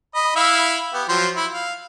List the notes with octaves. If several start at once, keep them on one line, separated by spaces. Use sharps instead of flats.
D#5 B5
E4 E5 F5
B3 G4
F3 F#3 C6
E4
F5